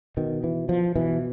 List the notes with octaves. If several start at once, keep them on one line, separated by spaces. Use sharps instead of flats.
B2 D#3
E3
F3
B2 E3